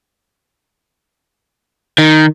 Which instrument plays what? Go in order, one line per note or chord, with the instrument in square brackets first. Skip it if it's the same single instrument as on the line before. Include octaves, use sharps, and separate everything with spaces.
[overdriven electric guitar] D#3